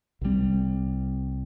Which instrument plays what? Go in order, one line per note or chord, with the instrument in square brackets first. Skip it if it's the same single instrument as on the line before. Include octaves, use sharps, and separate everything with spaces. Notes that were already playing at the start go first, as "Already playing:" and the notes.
[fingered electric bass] C2 B2 G3 C4